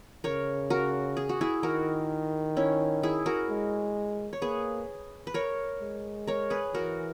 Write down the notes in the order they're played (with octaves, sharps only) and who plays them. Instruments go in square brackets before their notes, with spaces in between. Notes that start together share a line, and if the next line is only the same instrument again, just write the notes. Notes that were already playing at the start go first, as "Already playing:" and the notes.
[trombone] C#3 [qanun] A#4 C#5
[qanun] F#4 A#4
G#4
F#4
E4 G#4
[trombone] D#3 [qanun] F#4 A#4
[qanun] C#4 E4
E4 G#4
F#4 A#4
[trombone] G#3
[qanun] C#5
[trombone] A#3 [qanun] G#4 B4
[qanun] B4
A#4 C#5
[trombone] G#3
[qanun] A#4 C#5
G#4 B4
[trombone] E3 [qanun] F#4 A#4